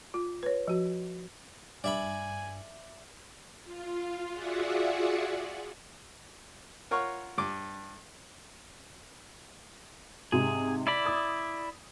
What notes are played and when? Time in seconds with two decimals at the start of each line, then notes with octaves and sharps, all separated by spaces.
0.14 F4
0.43 B4 C#5
0.67 F3 F#4
1.84 G2 D5 E5 G#5 B5
3.64 F4
4.32 F4 F#4 G#4 D5 E5 F#5
6.91 F4 A#4 C#5 F#5 C#6
7.38 G2 D6
10.32 G#2 C3 G#4
10.87 E4 D5 B5
11.05 D#6 G#6